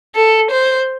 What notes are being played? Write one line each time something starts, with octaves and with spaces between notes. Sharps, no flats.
A4
C5